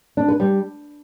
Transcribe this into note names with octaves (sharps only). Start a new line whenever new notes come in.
D4
B4
G3